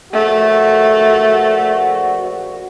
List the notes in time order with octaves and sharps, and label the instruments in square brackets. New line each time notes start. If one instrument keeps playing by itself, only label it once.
[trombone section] A#1 F#4 [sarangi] A3